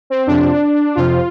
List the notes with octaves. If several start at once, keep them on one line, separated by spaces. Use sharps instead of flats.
C4
F2 C3 F3 D4
F2 C3 F3 F4